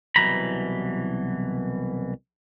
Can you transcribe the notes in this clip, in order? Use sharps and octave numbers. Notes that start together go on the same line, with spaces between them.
C2 B2 E3 F#3 A#5 B5